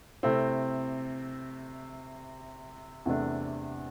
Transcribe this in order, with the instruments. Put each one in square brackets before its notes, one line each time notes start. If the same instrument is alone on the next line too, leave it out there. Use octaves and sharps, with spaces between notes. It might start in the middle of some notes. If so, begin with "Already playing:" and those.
[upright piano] C3 A3 C4 E4
E2 C3 A3 D4